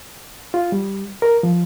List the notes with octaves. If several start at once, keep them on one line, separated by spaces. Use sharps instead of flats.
F4
G3
A#4
F3